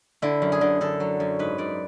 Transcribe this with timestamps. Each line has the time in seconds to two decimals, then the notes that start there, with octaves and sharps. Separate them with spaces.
0.22 D3 E4
0.42 F#2
0.52 G#4
0.61 D3
0.81 D3 A4
1.00 F#3
1.20 F#2
1.39 G#2 B4
1.58 G#2 D5